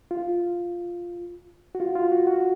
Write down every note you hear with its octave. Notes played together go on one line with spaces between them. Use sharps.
F4
F#4
F4
F4
F#4
F#4